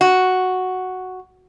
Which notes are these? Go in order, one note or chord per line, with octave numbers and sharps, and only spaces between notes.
F#4